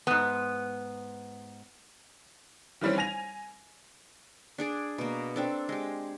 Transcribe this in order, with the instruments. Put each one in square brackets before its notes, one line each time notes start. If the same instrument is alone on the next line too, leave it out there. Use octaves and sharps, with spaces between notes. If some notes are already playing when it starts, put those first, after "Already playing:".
[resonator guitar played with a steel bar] G#2 B3
[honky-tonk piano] D#3 E3 G3 C4 C#4
G#5 A#6 F7
[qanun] D4 G#4 D5
B2 A#3
C4 D4 A4
G#3 G4